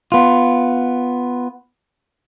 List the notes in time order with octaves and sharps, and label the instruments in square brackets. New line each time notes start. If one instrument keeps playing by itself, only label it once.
[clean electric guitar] B3 F4